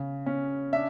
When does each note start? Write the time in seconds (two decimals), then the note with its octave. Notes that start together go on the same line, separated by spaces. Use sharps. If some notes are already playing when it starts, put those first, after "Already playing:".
Already playing: C#3
0.26 C#4
0.73 D4 E5